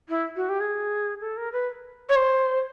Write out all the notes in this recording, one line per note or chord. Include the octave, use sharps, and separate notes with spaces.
E4
F#4
G4
G#4
A4
A#4
B4
C#5
C5